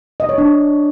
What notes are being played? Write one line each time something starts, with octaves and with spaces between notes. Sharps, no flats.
D#5
C#5
D4